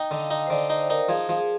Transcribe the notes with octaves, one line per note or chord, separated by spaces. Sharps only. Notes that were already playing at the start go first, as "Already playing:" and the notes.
Already playing: D#4 G5
D3 D#5
F5
D#4
C5
D3 D5
D#4 C5
D#4 A#4
F3 G#4
F3
G#4